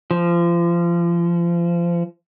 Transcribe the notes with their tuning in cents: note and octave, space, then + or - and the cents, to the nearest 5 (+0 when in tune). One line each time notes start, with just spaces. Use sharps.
F3 -30